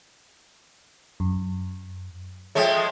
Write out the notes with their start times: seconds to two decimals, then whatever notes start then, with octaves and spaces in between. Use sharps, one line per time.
1.20 F#2
2.55 F3 G#3 A3 C#5 G5